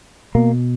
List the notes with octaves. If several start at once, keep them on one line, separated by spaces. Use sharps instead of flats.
B2 A#3